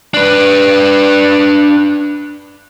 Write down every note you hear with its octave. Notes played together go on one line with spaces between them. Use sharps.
D4 B4